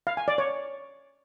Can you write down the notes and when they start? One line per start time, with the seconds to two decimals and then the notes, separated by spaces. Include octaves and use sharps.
0.07 F5
0.17 G#5
0.28 D5
0.38 C#5